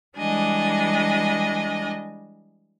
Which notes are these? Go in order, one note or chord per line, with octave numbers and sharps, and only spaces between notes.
E3 G3 G#3 D4 D#5 G#5